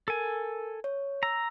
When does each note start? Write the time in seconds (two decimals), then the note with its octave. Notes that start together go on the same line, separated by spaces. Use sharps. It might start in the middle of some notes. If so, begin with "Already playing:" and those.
0.08 A4 A#4 G#5
0.84 C#5
1.23 A#5 E6